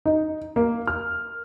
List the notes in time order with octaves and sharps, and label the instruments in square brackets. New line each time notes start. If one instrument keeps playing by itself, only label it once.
[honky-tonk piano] D#4
A#3
F6